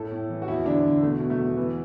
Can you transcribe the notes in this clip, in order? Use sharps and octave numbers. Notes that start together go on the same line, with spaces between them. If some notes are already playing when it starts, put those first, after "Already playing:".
Already playing: A2 A4
A2
E3
F#4
E2 E4
D3 D4
D3
B2 A3
B2
A3
E2
E3 B3